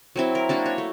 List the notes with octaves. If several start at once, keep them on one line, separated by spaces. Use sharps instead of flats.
F#3 C4 E4
A#4
A#3 D4 F#4
C#5
A3